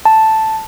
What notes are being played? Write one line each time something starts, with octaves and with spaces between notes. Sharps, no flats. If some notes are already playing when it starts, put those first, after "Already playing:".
A5